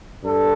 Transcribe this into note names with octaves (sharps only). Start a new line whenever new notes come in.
G2 A4